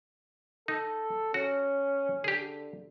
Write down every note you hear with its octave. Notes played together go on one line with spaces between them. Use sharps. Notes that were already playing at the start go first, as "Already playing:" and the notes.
D#4 A4
C#4 F#4
D3 G4 G#4